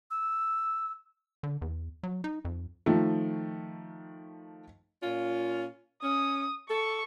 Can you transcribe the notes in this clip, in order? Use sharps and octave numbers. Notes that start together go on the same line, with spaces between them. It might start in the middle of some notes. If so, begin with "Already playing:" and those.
E6
D3
E2
F#3
D#4
F2
D#3 F3 A3
A#2 C#4 F4
C#4 D#6
A4 C#6